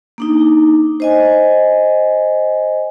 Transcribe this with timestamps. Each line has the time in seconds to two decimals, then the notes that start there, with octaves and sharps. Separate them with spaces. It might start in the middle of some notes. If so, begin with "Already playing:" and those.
0.18 A#3 D4 D#4
1.00 C5 D#5 G#5